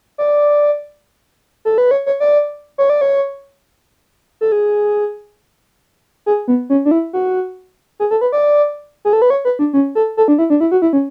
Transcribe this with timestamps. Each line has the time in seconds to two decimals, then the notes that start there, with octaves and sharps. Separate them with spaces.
0.18 D5
1.65 A4
1.78 B4
1.91 C#5
2.06 C#5
2.20 D5
2.78 C#5
2.90 D5
3.01 C#5
4.41 A4
4.52 G#4
6.26 G#4
6.48 B3
6.70 C#4
6.85 D4
6.91 E4
7.13 F#4
8.00 G#4
8.11 A4
8.21 B4
8.32 D5
9.05 G#4
9.13 A4
9.22 B4
9.30 C#5
9.45 B4
9.59 D4
9.73 C#4
9.95 A4
10.17 A4
10.28 D4
10.38 E4
10.50 D4
10.61 E4
10.71 F#4
10.82 E4
10.93 C#4